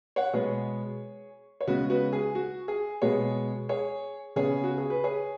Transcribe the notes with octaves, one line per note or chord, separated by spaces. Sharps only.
C#5 F#5
B2 G#3 B3 G#4 C#5
C#5
C#3 G#3 B3 F#4 B4
F#4 B4
G#4
F#4
G#4
B2 G#3 B3 G#4 C#5
G#4 C#5
C#3 B3 G#4 C#5
F#4
G#4
B4
G#4 C#5